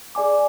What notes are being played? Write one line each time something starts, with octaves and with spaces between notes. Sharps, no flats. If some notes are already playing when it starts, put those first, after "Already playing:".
G#4 D5 G#5 D6